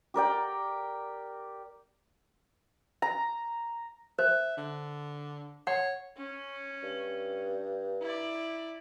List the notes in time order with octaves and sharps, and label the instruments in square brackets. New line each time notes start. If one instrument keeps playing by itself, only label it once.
[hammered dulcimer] G4 A#4 D5 G5
[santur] A#5
[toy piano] C5 [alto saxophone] E5
[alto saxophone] D3
[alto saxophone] C#5 [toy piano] F#5
[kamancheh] C#4
[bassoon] G2
[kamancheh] E4 D5